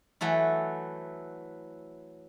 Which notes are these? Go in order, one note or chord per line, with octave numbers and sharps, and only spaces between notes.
E3 F#3 A3 E4